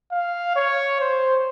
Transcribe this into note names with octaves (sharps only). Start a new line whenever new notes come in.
F5
C#5
C5